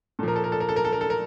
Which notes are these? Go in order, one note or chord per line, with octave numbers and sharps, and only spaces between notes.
A#2 F3 A4 A#4
A4
A#4
A4
A#4
A4
A#4
A4
A#4
A4
A#4